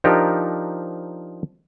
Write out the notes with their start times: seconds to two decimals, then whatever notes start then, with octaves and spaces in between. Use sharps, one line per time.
0.04 F3 D4 D#4 G4 A#4